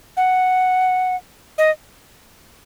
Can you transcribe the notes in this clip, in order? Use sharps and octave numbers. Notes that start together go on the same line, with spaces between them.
F#5
D#5